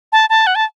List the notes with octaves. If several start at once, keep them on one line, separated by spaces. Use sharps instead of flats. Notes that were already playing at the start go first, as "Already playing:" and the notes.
A5
A5
F#5
A5